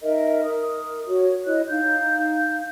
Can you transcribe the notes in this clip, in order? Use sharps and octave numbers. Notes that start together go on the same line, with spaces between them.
D#4 A#4 D#5 E5
A#4 D#6
F#4 C#5
E4 C#5 D#5 F#6
D#4 F5 G6